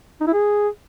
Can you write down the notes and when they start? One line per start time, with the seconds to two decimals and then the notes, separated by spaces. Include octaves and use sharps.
0.20 D#4
0.27 E4
0.33 G#4